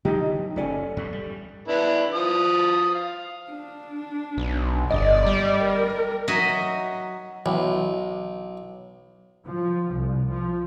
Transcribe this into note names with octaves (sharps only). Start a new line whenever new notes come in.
D3 F#3 D#4 G4
F#1 C#4 A4 D5 G#5
E2 G2
G3
B3 D4 E4
F3 D#6
F5
D4
B1
G1 D5 D#5
G3
A#4
F#3 D#4 F#4 D#5 E5
B1 E3
F3
C2
F3